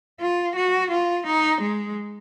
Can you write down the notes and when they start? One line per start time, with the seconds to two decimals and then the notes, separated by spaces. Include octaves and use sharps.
0.20 F4
0.56 F#4
0.90 F4
1.26 D#4
1.61 G#3